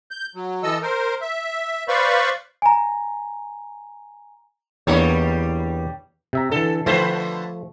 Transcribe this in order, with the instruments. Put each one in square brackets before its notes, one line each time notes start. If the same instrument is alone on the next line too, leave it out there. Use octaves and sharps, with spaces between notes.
[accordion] G6
F#3
E3 A4 D#5 E6
A#4 C5
E5
B4 C5 D5 F5 B5 C#6
[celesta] G#5 A#5
[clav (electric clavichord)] E2 A#3 B3 [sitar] G3 D4 C#5
[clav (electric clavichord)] C3 E5 A#5
[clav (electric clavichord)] D3 E3 [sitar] A4
[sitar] D3 B4 C5 [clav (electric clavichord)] F3 A3